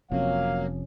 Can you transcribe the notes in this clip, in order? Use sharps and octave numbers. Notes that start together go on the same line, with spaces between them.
F1 C3 F3 F#3 A#3 C4 C#4 F5